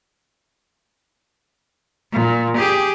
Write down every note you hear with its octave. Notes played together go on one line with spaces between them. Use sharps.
A#2
G4 G#4